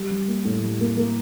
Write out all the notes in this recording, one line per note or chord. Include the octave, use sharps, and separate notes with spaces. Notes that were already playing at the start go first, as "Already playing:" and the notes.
Already playing: G3
G3
A#3
A2
G3
A#3
A#3